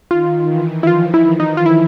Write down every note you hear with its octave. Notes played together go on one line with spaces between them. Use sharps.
D#3 F4
E3
E4
F3 F4
E4
D#4
F4
E4